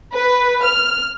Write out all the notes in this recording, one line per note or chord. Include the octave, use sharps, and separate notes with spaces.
B4
F6